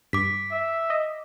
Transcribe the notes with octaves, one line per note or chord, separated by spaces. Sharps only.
G2 D6 B6
E5
D#5